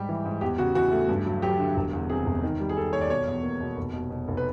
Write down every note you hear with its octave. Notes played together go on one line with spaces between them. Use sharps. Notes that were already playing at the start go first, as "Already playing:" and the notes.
Already playing: G#2 G3 G4
E3
G#2
E2 G4
C#3 F#4
E3 F#4
A3
G2
F#3
F#3 G4
D3
E1
E2
C3 G#4
E1
D#3
G3
G#4
D#3 A4
D#2 C#5
D5
B2 C#5
E2
A#3
B2
F1
B2
B2
F1
B4